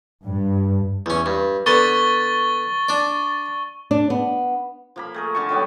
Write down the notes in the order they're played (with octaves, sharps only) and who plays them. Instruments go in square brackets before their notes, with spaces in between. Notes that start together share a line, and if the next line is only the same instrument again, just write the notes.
[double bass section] G2
[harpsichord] E2 C#4
G2
[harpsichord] D3 B3 [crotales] C#6 A6 G7
[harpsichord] D4 D5
[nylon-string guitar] D4
B3
[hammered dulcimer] F3 A#3 B5
A3 G#4 A#4
D3 G#5 A5 C#6
D#3 F#3 G3 B3